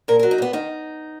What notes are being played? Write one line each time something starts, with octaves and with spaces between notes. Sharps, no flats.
A#2 A#4
F#3 A#4
D#4
A#2 B3
D#3 D#4